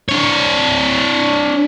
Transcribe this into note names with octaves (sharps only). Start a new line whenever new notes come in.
D4 C#5